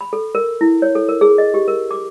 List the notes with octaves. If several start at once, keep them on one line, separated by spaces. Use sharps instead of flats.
B5
A4
A#4
E4
C#5
A4
A#4
G#4
D#5
G4
A#4
D6